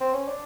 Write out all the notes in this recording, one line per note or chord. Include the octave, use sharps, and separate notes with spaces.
C4
C#4
D4